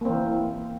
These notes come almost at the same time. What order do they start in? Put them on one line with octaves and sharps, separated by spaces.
A#3 C4 E3